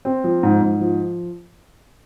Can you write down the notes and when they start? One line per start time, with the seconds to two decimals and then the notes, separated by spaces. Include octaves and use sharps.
0.05 C4
0.24 F3
0.43 G#2
0.62 G#2
0.81 F3